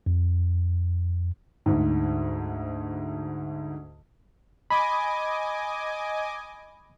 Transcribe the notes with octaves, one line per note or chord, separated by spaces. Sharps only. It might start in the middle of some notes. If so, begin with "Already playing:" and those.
F2
D2 G#2
D#5 G#5 B5 D6